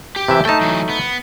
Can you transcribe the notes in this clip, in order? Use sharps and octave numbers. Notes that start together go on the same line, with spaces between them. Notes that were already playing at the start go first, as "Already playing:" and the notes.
G4
C3 E3 E5
A3 D#4 G5 A5
E3 F#3
B3